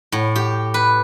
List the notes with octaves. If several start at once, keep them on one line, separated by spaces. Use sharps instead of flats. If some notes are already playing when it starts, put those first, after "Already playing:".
A2
G4
B4